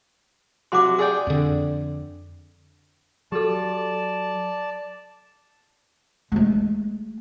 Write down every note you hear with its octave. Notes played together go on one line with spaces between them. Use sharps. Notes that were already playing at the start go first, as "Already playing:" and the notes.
C3 F#3 F#4 C6 D6
G#4 D5 G5
F2 D3
F#3 G4 A4 D5 A5
G#3 A3